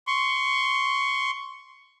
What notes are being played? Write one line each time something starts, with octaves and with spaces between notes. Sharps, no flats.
C6 C#6